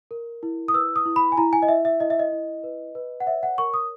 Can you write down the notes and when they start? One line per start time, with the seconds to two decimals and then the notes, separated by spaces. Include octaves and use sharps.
0.11 A#4
0.43 E4
0.68 D#6
0.74 B4 E6
0.96 D#6
1.06 E4
1.16 B5
1.32 G#5
1.38 E4 A#5
1.53 G#5
1.62 D#5
1.68 E4 E5
1.85 E5
2.00 E4 D#5
2.10 E5
2.19 D#5
2.32 E4
2.64 B4
2.95 B4
3.20 F#5
3.27 C#5 E5
3.43 F#5
3.58 A#4 C#6
3.74 D#6